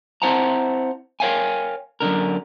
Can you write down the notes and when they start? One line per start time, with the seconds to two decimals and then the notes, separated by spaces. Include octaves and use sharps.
0.22 C4 E4 C5 F#5 A5 A#5
1.20 A#4 C#5 F5 G5 G#5
2.00 F#2 B2 D3 A#4